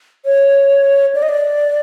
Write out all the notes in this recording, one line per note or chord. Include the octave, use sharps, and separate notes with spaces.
C#5
D5
D#5
D5